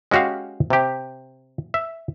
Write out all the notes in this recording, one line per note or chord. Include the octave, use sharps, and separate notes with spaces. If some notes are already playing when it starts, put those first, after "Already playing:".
G#3 C#4 F#4 G4 F5
C3 G4
E5